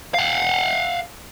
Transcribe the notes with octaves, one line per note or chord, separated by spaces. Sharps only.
F5 F#5